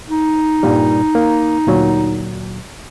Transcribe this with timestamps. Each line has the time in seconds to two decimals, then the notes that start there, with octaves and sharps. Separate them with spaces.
0.07 D#4
0.63 G2 A#2 G3
1.15 A#3
1.67 D2 A#2 F#3